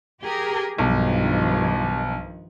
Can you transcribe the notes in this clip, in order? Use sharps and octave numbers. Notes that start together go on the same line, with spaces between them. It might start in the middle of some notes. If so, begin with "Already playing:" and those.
G4 G#4 A#4
B1 G2 D#3 F3